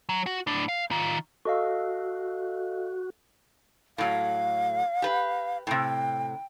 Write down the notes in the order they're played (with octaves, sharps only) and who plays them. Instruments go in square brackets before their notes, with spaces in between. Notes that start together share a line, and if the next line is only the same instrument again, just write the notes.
[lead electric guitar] F#3
F#4
A2 D4
F5
D#3 F4
[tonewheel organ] F#4 [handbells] A4 D#5 F5
[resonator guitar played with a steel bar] A2 F#3 [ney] F5
[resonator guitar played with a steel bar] G4 B4
[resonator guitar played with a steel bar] A2 C3 [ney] G5